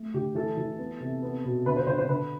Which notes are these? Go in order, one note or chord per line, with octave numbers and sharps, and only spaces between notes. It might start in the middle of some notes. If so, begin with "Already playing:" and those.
Already playing: A3
D3 G4
E3 A4
E3
B3
C3
B3
B2
D3 B4
C5
D3 C5
C5
D3 B4